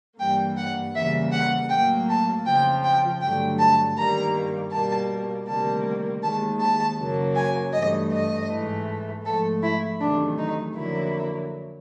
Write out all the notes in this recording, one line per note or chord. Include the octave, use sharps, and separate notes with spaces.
G2 E3 G3 A#3 G5
F#5
E2 C#3 E3 G3 A#3 E5
F#5
A2 F#3 A#3 G5
A5
F2 C#3 F3 G5
G5
G2 D3 F#3 A3 G5
A5
G2 D#3 G3 A#3 A#5
B2 G3 A#3 A5
D2 C3 D#3 G3 A#3 A5
D#2 D#3 G#3 A5
A5
F#2 C#3 F#3 A#3
G#5
G2 E3 A3 D#5
D#5
G#2 E3 A3
G#2 F3 A3 A4
E4
E2 C3 D#3 F#3 A3 D4
D#4
F2 D3 F#3 A#3 E4